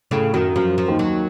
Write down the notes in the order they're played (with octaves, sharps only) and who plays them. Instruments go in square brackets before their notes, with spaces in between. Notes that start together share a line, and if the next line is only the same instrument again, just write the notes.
[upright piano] A2 A3 [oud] C#3
[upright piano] F#2 F#3 [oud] D#3
[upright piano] F#2 F#3 [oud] F3
[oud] F3
[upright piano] D#2 D#3
[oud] F#3